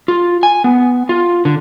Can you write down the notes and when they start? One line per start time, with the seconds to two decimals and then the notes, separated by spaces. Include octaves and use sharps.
0.08 F4
0.43 G#5
0.64 B3
1.09 F4
1.45 D3